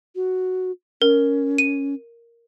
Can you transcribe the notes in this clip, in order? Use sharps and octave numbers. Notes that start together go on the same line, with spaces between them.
F#4
C#4 A#4
D#7